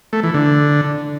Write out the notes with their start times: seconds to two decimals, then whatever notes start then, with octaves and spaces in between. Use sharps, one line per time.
0.13 A3
0.23 E3
0.34 D3